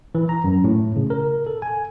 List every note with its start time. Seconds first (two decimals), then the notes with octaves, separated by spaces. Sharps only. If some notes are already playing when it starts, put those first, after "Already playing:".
0.15 E3
0.29 A#5
0.44 F#2
0.64 A2
0.96 C#3
1.10 A#4
1.47 A4
1.62 G#5